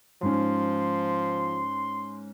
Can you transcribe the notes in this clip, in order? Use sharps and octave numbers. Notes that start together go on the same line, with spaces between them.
G#2 F3 C#4 C6